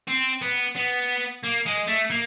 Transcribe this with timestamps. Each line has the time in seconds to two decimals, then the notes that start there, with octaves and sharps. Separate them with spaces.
0.07 C4
0.42 B3
0.76 B3
1.43 A#3
1.66 G#3
1.87 A3
2.10 A#3